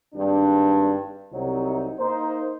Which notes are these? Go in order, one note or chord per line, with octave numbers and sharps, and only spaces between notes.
G#1 G2 D4
C2 C3 F#3 C4 D#4
A#3 D#4 C5